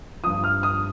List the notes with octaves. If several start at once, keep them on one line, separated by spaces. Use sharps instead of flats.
G2 F3 D#6
F6
D#6